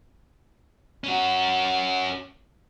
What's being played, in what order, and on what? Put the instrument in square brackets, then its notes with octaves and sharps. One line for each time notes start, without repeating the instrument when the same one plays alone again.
[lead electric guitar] C#4 F#4